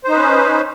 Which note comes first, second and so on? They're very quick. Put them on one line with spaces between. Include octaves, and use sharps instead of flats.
C5 D#4 B4 C#4